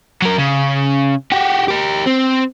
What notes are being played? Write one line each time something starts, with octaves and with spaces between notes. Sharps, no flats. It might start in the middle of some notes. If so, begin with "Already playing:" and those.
F#3 A#4
C#3
F#4 G4
G4 A#4
C4